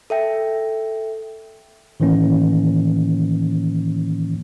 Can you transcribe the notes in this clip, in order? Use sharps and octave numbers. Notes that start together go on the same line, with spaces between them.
A4 E5 G5
A2 D#3 E3 A#3 C#4